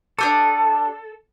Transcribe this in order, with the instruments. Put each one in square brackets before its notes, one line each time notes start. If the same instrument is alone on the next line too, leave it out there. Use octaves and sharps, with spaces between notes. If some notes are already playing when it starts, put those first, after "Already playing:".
[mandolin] D4 G4 D#6 [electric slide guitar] A4